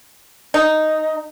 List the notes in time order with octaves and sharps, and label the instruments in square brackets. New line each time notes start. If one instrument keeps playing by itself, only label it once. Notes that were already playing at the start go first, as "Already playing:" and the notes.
[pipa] D#4